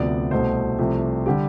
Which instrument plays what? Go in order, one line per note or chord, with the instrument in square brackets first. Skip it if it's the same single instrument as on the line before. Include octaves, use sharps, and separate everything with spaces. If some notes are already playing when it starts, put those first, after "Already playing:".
Already playing: [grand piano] D2 C3 F3 B3 D5
C2 B2 A3 C5
C2 C3 F3 A3
D3 G3 G4